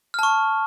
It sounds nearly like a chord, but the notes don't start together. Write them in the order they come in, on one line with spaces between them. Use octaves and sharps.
F6 A5 C#6